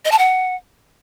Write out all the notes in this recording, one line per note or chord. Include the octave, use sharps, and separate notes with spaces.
D#5
A5
F#5